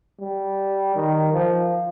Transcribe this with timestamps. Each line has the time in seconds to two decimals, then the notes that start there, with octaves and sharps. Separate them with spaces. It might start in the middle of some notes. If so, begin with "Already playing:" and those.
0.20 G3
0.96 D#3
1.34 F3